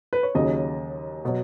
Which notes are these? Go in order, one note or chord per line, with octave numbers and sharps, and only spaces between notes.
B4
C#5
D#2 C#3 F#3 D#5
B2 F#3